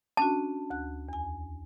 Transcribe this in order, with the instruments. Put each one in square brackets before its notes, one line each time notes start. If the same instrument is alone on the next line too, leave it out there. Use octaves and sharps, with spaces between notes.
[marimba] C#4 D4 F#4 [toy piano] A5
[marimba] D2 F#6
E2 G#5